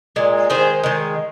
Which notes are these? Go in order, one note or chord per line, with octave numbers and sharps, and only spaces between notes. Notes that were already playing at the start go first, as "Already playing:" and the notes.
A#2 G#3
D#3 G#3 G#4 C5
D#3 G#3